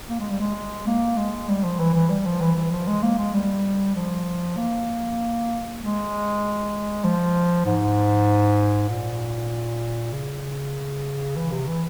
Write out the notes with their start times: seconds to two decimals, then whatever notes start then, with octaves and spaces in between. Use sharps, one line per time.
0.09 A#3
0.20 G#3
0.30 G3
0.40 G#3
0.87 A#3
1.18 G#3
1.49 G3
1.64 F3
1.79 E3
1.95 E3
2.10 G3
2.26 F3
2.41 E3
2.56 E3
2.72 F3
2.87 G#3
3.03 A#3
3.18 G#3
3.34 G3
3.95 F3
4.57 A#3
5.81 G#3
7.04 F3
7.66 G#2
8.89 A#2
10.13 C#3
11.36 E3
11.52 C3
11.67 E3